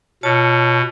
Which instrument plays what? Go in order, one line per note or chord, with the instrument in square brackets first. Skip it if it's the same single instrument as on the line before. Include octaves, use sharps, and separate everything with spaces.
[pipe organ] B2 [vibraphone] F4 C#5 A5